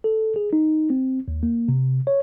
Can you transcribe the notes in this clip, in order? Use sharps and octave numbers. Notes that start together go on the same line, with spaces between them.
A4
G#4
D#4
C4
D#2
A#3
C3
C#5